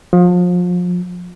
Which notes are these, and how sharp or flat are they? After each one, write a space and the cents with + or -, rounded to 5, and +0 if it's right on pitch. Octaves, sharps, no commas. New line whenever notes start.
F3 +30